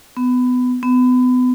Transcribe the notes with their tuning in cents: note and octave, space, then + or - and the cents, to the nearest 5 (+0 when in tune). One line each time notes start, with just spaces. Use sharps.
B3 +20
B3 +30